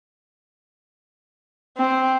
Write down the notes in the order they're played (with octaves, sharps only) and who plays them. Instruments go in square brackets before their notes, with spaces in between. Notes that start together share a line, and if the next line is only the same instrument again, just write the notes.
[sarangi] C4